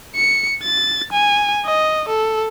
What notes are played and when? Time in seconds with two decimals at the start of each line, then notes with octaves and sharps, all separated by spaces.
0.16 C#7
0.64 A6
1.12 G#5
1.65 D#5
2.09 A4